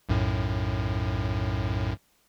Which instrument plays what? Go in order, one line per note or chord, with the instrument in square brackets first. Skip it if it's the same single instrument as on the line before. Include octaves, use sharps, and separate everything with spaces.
[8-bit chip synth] B1 F#2 A2